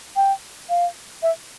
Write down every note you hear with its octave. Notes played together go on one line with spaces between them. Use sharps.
G5
F5
E5